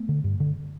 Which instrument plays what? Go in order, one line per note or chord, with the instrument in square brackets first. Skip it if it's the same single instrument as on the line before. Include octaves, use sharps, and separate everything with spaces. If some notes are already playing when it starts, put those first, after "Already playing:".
Already playing: [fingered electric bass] A3 B3
D3
G2
D3